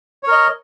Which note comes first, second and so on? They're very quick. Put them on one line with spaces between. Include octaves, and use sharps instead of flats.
C#5 A#4 D#5